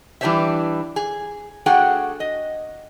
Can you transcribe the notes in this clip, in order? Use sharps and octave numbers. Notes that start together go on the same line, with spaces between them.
E3 G3 D4 C5 C#5 E5
G#4
A3 D4 F#4 G#4 F#5 G5
D#5